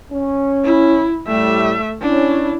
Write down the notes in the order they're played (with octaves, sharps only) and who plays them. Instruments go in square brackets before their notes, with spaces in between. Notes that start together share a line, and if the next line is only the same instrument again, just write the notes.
[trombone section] C#4
[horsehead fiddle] E4
[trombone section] A2 G3 [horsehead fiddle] A3 E5
[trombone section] C#4 [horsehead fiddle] D4 E4